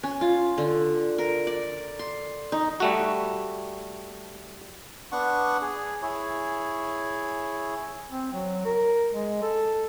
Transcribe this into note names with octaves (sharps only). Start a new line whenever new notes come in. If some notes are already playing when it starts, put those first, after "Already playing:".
C#4
F4
D3
A#4
D5
C6
D#4
G3 A3 F#4
B3 D4 F#5 C#6
G#4
E4 G#4 C#5
C4
F#3
A#4
G#3
A4